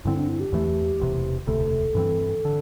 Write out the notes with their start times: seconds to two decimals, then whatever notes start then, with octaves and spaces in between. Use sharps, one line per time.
0.05 G2 D3 C4 E4
0.17 D4
0.28 E4
0.40 G4
0.52 E2 E3 A3
1.00 E1 E2 C3
1.47 E1 D2 C3 A3 A4
1.95 G2 E3 C4
2.45 D3